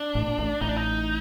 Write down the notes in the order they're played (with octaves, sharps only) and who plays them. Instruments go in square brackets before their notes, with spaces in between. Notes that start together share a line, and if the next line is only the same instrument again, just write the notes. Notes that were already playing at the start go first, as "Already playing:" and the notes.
Already playing: [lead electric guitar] D4
[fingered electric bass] A1 A2
A#2
A1 A2
[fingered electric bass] A1 A2 [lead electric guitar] D#4
[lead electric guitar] D4
D#4